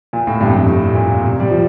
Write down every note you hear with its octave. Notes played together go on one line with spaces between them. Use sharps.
A#2
A2
G2
F2
G2
A2
A#2
C3
G3
F3